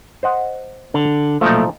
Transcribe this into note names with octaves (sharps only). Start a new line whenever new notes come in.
C5 D#5 F#5
D3
B1 A#2 F3 A3 D#4